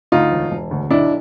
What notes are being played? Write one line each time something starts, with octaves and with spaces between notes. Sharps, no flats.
D2 D#4 F4
E1
E1
D2
B1 D4 E4